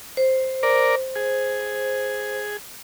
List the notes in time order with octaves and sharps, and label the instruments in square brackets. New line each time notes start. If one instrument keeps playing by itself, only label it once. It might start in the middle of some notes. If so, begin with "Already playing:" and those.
[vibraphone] C5
[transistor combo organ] A#4 D5
G#4